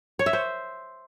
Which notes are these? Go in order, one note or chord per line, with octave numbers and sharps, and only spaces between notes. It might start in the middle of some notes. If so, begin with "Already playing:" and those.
C#5
E5
C5